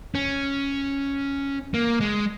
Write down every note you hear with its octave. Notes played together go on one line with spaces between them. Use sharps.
C#4
A#3
G#3